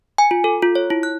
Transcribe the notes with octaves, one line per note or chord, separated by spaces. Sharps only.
G#5
F4
A4
F4
C#5
E4
F#6